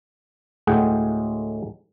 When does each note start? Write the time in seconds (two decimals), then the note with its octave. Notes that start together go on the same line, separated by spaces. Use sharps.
0.67 D2 A2 G#3 G#4 F#5 G5